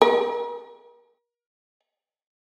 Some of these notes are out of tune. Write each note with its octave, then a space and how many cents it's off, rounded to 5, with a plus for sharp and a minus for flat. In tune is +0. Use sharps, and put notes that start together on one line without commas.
A#4 +35